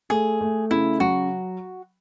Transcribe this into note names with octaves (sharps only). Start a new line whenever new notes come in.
A3 G#4
A3
C#3 E4
F#3 F#4